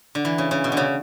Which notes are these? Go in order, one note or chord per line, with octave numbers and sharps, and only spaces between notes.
D3
E3
C#3
C#3
B2
D3
C#3